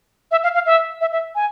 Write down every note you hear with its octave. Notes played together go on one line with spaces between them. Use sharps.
E5
F5
F5
E5
E5
E5
G#5